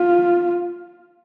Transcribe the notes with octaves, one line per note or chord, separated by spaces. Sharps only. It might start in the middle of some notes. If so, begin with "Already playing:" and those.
Already playing: F4